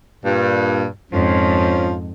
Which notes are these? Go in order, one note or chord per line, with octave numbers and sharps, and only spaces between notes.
G2 A#2
F2 G#2 F3 C#4